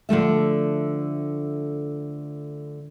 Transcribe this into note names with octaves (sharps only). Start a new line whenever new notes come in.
D3 F3 A3 E5